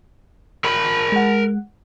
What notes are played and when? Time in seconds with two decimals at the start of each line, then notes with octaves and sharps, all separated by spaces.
0.64 A#4 B5
1.12 G#3 F#5